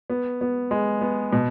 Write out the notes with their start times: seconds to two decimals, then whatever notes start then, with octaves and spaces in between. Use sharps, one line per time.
0.10 B3
0.41 B3
0.71 G#3
1.01 B3
1.33 B2